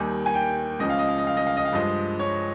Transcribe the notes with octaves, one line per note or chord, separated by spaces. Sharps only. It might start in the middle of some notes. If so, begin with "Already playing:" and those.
Already playing: D#2 D#3 G3 G#5
G#5
G5
C#2 C#3 F3 D#5
F5
D#5
F5
D#5
F5
D#5
F5
D#5
F5
G2 F3 G#3 D#5
C#5